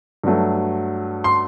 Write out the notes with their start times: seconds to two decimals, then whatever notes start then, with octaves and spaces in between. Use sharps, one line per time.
0.24 G2 F#3 A3
1.24 C6